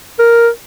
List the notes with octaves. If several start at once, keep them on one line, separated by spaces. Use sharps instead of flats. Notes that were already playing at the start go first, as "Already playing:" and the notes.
A#4